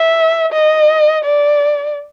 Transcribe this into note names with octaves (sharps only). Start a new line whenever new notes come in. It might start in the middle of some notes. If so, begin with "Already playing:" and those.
Already playing: E5
D#5
D5